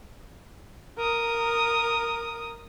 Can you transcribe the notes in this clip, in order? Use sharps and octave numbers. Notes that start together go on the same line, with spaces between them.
A#4 D#6